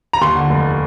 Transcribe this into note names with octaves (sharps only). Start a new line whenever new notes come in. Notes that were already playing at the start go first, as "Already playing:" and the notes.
A#5
D#2 C6
D3
F1